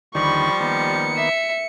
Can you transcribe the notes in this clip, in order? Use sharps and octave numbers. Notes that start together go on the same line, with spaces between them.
D#2 D3 D#3 F3 G3 B5 C#6
D#3 A#3 B3 C#7
E5